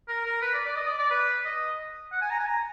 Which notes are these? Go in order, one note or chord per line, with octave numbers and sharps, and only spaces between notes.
A#4
A#4
B4
D5
D5
D#5
D5
D5
B4
D#5
F#5
G#5
A#5
G#5
A#5